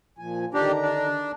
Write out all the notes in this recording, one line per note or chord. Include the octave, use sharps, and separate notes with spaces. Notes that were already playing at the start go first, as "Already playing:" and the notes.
A#2 F3 G#5
D3 D#3 D4 G4 A#5
D4